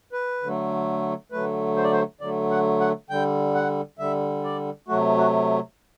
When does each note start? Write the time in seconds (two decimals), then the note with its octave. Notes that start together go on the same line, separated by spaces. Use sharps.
0.13 B4
0.42 D3 F#3 A3
1.32 D3 F#3 A3 B4
1.77 C5
1.84 D5
1.92 C5
2.21 D3 F#3 A3 D5
2.50 F#5
2.81 F#5
3.10 D3 G3 G5
3.55 F#5
3.99 D3 G3 E5
4.44 D5
4.88 C3 F#3 A3 F#4
5.18 F#4